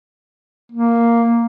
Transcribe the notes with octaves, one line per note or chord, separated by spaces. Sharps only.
A#3